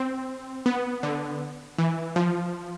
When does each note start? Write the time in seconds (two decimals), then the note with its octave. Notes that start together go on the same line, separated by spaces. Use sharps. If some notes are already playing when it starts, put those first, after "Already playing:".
Already playing: C4
0.66 B3
1.03 D3
1.78 E3
2.16 F3